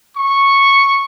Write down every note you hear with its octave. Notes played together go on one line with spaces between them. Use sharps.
C#6